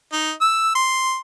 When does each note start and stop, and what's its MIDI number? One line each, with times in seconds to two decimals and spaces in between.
0.13 0.31 63
0.41 0.73 88
0.75 1.18 84